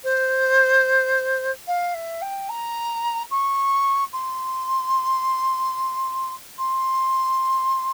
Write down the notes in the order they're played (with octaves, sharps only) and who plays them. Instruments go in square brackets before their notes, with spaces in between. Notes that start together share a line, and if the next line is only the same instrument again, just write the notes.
[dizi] C5
F5
E5
G5
A#5
C#6
C6
C6